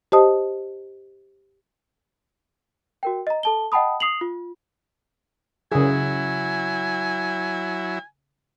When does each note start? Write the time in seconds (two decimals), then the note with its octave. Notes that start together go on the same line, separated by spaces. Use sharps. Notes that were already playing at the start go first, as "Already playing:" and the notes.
0.12 G4 C5 D#5 A5 D#6
3.03 F#4 A#4 G5
3.27 D#5 A#5
3.43 A4 A5 G7
3.72 D#5 F#5 G5 A5 B5 D#6
4.00 D#6 C7 F7 F#7
4.21 F4
5.72 C#3 F#3 E4 G#4 G#5